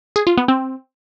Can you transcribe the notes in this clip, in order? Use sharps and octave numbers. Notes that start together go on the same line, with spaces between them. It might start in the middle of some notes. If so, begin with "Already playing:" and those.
G#4
F4
B3
C4